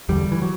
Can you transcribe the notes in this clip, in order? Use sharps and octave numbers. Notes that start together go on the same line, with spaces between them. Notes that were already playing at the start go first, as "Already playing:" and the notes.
E2 D3 G3
E3
F#3